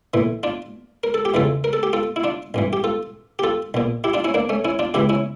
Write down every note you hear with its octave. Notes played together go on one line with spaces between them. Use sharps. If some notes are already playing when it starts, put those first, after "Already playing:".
A#1 A2 E3
D4 F4
A#4
A4
G4
F2 C#3 E3 F4 A4
A#4
A4
G4
F4 A4
E4
D4 F4
A1 G2 E3
G4
F4 A4
G4
F4 A4
A#1 A#2
E4 G4
D4 F4
C#4 E4
A#3 D4
A3 C#4
C#4 E4
D4 F4
C#2 C#3 E3 E4 G4
C#4 E4